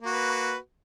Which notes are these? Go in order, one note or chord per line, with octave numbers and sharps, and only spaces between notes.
A#3 F#4 B4